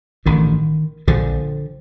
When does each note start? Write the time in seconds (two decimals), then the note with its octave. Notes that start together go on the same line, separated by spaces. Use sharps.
0.25 A1 G2 D3 D#3
1.07 A#1 A#2 D3 F3